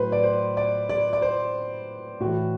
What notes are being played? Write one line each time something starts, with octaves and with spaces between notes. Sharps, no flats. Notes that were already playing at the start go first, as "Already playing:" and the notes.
Already playing: A2 F#3 B4 C5
D5
C5
D5
D5
D5
C5
A2 E3 F#4